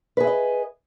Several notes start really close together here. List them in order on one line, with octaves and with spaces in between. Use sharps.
B4 G#4 E5 D#5